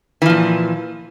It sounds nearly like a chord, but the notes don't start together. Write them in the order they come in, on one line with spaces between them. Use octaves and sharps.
E3 F3 A#2